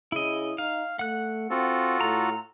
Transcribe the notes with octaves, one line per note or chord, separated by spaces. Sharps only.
C#3 E4 D#5
D#4 F5
A3 F#5 F#6
C4 F4 F#4 A4
A2 A#5